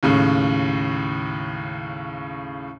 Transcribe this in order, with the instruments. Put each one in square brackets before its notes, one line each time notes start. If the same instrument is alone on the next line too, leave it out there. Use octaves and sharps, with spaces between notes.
[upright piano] D#2 A2 C#3